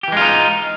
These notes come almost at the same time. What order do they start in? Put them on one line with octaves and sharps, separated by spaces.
G4 E3 G#3 F4 D#4